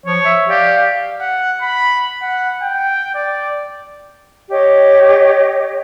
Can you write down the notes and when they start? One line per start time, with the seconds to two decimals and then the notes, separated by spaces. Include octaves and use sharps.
0.06 F3 C#5
0.25 E5
0.49 G4 D5 F5
1.20 F#5
1.62 B5
2.22 F#5
2.62 G5
3.15 D5
4.50 G4 C#5 D#5